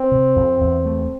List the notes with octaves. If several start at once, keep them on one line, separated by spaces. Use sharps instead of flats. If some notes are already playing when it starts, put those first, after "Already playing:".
Already playing: C4
C3
F2
E2
A3